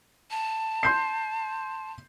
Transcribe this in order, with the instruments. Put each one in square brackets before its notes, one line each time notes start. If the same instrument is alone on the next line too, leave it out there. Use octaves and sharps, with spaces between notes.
[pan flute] A5
[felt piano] C6 G6 C7